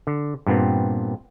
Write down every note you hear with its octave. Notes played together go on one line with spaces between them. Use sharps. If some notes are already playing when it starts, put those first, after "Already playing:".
D3
G2 A#2 B3 C4